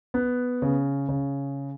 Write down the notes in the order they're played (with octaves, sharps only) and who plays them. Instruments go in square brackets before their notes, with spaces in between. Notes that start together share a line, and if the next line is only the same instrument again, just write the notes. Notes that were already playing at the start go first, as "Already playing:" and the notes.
[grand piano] B3
C#3
C#3